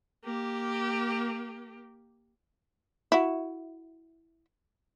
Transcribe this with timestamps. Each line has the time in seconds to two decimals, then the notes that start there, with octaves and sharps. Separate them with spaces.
0.24 A#3 G4
3.12 E4 F#4